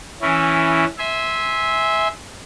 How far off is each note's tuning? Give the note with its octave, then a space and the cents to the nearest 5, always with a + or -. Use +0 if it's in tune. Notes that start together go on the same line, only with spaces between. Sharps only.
E3 +0 C#4 +0 E4 +0
E5 -15 G#5 +0 C6 +0